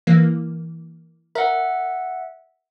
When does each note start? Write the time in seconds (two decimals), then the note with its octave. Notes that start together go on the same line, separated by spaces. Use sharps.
0.07 E3 A#3
1.35 A#4 E5 F#5